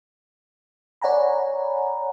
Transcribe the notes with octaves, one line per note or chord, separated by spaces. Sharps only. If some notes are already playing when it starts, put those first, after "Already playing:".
C#5 D5 F#5 G#5 A#5 B5